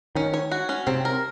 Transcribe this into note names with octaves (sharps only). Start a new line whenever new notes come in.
D#3 C#4
C#5
F#4
C#4
C3 C4
A#4